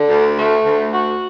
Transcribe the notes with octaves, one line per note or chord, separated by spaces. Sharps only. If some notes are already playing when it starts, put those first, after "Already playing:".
Already playing: D3
D2
A3
D2
F#4